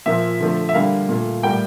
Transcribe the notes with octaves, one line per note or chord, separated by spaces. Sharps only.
A#2 F3 A#3 E5
D3 F3 A3
E5
D3 G3 A#3 F5
A#2 A3
A2 G3 A#3 G5